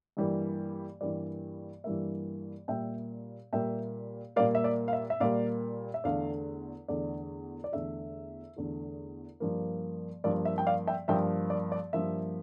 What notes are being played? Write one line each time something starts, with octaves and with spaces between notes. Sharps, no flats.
G2 E3 G3 A#3
G2 E3 G3 A#3 D5
G2 E3 G3 A#3 E5
A#2 G3 A#3 E5 G5
A#2 G3 A#3 E5 G5
A#2 G3 A#3 D5 F5
E5
D5
F5
E5
E5
A#2 G3 A#3 D5 F5
E5
E2 D3 A3 D5 F5
E2 D3 A3 D5
D5
E2 D3 A3 E5
E2 D3 A3
G2 F3 A#3
G2 F3 A#3 D5
E5
G5
D5 F5
E5 G5
G2 F3 A#3 E5 G5
D5
D5
G2 F3 A#3 E5